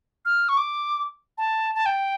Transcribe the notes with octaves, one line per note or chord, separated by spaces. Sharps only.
F6
C#6
D6
A5
A5
G5